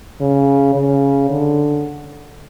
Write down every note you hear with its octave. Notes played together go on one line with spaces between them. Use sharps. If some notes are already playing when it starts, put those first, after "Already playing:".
C#3
C#3
D3